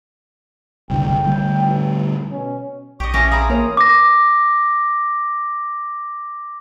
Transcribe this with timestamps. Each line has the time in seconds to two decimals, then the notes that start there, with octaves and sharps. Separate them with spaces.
0.90 F#1 C2 D3 G5
1.24 D3 G3 A3
1.63 A1
2.31 B2 C#4
3.00 A#1 G4 D#5 C#6
3.14 E3 C#4 G4 A#6
3.31 C4 G#4 F5 A#5 B5 D#6
3.50 A#3 F4 A#4 C#5
3.77 D6 A#6